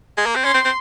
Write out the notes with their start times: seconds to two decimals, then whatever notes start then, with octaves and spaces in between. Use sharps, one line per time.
0.17 G#3
0.26 A#3
0.35 C4
0.44 C#4 C6
0.54 C4
0.65 C4